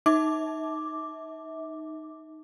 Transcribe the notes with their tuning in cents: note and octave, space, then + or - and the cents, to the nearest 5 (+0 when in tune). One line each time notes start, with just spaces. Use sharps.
D#4 +0 E5 -35 D6 +0